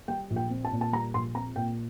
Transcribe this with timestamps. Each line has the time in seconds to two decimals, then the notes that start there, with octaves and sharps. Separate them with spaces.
0.08 G3 G5
0.30 A#1
0.36 G5
0.50 C4
0.65 A5
0.72 A#2
0.81 A5
0.93 G3 A#5
1.14 A#1 C6
1.35 C4 A#5
1.56 A#2 G5